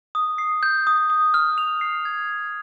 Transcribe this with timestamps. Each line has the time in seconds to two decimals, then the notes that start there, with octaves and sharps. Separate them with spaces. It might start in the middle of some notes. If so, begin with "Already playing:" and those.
0.15 D#6
0.38 C7
0.63 G6
0.87 D#6
1.10 D#6
1.34 F6
1.58 F7
1.81 C7
2.05 G#6